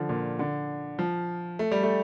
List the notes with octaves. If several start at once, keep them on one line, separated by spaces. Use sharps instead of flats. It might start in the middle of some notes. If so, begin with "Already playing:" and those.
Already playing: D3 F3
A#2
D3
F3
A3
G3
A3